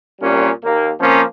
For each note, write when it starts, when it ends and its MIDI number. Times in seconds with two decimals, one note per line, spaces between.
0.20 0.49 36
0.20 0.49 46
0.20 0.49 55
0.20 0.49 61
0.64 0.90 39
0.64 0.90 58
0.99 1.21 53
0.99 1.21 58
0.99 1.21 60
0.99 1.21 61